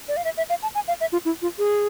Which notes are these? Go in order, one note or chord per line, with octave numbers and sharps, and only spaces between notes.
D5
F5
E5
E5
F5
A5
G#5
F5
E5
F4
E4
F4
G#4